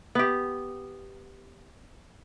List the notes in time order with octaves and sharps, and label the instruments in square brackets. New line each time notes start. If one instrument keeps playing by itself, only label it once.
[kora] B3 G4